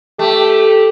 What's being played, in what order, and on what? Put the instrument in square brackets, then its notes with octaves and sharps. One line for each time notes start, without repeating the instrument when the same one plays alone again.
[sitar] A3 [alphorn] G4